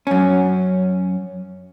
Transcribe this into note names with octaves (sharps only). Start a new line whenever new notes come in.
F#2 C#4